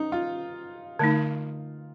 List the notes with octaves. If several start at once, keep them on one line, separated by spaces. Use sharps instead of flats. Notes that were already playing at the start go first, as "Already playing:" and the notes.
Already playing: D#4
F4
D3 A3 D#4